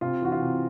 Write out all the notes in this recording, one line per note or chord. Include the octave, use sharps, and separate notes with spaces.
C3 F4
E3 F#4
F4
C3